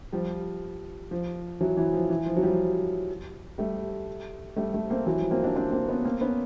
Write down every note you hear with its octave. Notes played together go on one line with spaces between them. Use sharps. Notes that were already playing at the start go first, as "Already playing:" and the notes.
F3 G3
F3
E3 F#3
E3
F3
E3
F3
F#3
F3 G3
G3 A3
G3 A3
G3 A3
A#3 C4
E3 F#3
F3 G3
A#3 C4
C4 D4
C4 D4
A#3 C4
B3 C#4
A#3 C4
B3 C#4